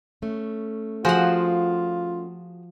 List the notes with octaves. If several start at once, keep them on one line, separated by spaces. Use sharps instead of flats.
A3 C#4
F3 F4 F#4 G#4 C5 F#5